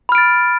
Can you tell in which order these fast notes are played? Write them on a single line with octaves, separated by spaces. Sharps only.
B5 F6 D7 A6